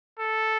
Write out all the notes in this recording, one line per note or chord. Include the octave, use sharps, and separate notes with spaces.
A4